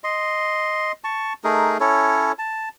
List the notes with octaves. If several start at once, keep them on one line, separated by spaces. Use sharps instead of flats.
D#5 C6
A5 C#6
A3 D#4 G#4 A#4
C#4 E4 A4 C#5
A5